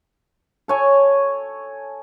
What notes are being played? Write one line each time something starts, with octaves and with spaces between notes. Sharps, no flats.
A4 C#5 G#5